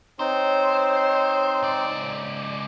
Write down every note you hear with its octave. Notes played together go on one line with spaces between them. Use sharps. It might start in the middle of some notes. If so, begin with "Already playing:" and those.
C4 D#4 C5 C#5
C#2 D5